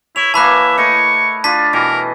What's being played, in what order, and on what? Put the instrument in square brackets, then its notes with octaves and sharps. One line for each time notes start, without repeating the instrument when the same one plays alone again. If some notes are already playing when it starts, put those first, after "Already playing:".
[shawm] E4 [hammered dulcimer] C#5 [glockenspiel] F7
[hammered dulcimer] E3 A#3 [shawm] E5 [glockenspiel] A5 B5 F#6
[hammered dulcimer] A3 E4 D#5 [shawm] C#6
[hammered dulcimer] D4 F4 [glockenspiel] A5 B6
[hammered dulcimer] B2 E3 D#5 [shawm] A#4